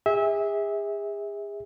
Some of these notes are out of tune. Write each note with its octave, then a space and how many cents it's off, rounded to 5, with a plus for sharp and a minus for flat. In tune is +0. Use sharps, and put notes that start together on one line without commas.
G#4 -35 E5 -25